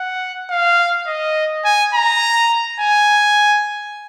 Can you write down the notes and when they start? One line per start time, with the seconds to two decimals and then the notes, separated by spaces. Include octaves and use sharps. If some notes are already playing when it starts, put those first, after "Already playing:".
Already playing: F#5
0.50 F5
1.07 D#5
1.65 G#5
1.94 A#5
2.81 G#5